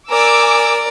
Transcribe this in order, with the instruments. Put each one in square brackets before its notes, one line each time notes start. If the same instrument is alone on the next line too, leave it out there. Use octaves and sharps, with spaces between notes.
[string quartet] A#4 D5 [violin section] G#5 D6 E6